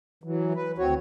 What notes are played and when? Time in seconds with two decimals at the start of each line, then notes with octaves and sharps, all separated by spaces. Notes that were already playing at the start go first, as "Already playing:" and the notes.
0.24 E3 F#3
0.54 B4
0.78 D2 C4 F#4 C#5